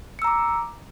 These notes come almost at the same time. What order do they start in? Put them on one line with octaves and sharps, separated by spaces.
C#7 E6 A#5 D6